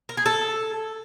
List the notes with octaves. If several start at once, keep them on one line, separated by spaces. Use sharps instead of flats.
A#4
G#4
A4